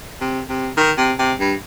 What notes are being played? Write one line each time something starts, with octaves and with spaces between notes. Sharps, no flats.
C3
C3
D#3
C3
C3
G2